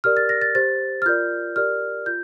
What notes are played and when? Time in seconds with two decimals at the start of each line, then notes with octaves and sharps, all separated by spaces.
0.04 G4 A#4 D5 F6
0.17 A6
0.29 A#6
0.42 A6
0.55 G4 C5 A6
1.02 F6
1.06 F4 A#4 D5 G6
1.56 G4 A#4 D5 F6
2.06 F4 G6